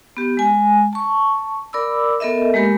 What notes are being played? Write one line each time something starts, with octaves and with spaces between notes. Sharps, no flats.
B3 G4
G#3 G#5
A5 C#6
A#4 D5 B5 D6 E6
B3 A4 A#4 D#5 E5
G#3 A#3 G4 A#4 B5